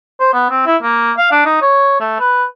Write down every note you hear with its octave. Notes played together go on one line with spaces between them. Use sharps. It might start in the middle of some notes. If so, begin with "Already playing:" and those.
C5
B3
C4
E4
A#3
F5
D4
D#4
C#5
A3
B4